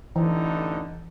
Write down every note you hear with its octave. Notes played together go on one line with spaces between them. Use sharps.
A1 D3 E3 D#4